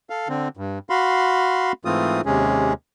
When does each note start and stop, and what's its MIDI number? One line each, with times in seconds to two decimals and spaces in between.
0.10 0.28 69
0.10 0.28 77
0.29 0.48 50
0.29 0.48 60
0.57 0.79 43
0.90 1.72 66
0.90 1.72 77
0.90 1.72 83
0.90 1.72 84
1.85 2.21 44
1.85 2.21 52
1.85 2.21 57
1.85 2.21 60
1.85 2.21 65
1.85 2.21 87
2.26 2.73 39
2.26 2.73 48
2.26 2.73 56
2.26 2.73 61
2.26 2.73 68